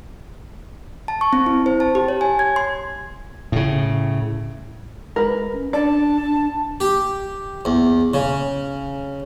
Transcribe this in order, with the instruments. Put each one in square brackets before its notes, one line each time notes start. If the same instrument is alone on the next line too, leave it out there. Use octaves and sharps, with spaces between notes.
[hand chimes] A5
C#6
C4
E4
C5
A5
G4
C#5
G#5
G#6
C6
[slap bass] A2 C#3
[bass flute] G#3 [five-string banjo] A#4 B4
[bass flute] C#4
[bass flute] D4 [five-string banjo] D5 [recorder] A5
[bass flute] D4
[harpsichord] G4
E2
C#3